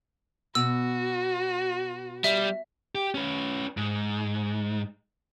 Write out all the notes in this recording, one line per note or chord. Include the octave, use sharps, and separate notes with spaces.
B2 F#4 E6
G3 E5
G4
C#4 B4
G#2